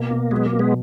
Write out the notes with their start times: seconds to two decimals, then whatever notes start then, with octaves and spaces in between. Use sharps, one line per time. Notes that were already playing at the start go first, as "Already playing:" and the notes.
Already playing: B2 A#3
0.11 B2
0.31 F#3 G#3 B3
0.46 A#3
0.53 B2
0.59 G#3 B3